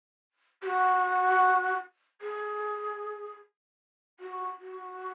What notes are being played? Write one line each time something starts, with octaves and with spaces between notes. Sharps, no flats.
G4
F#4
G#4
F#4
F#4